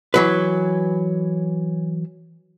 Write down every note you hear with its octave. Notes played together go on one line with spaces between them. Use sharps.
E3 F#3 B4